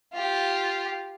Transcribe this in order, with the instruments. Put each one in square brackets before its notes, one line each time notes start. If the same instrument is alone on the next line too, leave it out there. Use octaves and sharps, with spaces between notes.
[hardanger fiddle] F4 G4